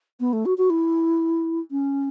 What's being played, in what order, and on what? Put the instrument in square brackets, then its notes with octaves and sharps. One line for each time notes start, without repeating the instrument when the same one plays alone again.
[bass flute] B3
A3
F#4
F#4
E4
C#4